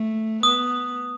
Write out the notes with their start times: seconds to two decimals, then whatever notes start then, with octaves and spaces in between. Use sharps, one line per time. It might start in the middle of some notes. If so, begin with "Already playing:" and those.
Already playing: A3
0.43 B3 D#6